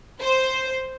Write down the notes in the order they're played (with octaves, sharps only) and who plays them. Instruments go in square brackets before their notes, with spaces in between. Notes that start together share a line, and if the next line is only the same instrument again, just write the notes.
[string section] C5